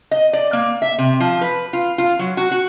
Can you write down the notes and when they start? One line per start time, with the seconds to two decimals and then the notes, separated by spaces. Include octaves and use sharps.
0.11 D#5
0.33 D5
0.53 A#3
0.82 E5
0.98 C3
1.20 F3
1.41 B4
1.73 F4
1.98 F4
2.19 F#3
2.37 F#4
2.51 F#4